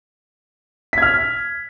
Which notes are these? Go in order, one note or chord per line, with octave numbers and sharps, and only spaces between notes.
F6 G#6 B6